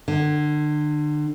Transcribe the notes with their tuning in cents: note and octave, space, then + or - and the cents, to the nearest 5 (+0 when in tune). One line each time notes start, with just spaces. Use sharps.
D3 +35